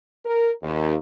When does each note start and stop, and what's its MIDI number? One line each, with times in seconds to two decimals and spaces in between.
0.25 0.51 70
0.63 0.95 39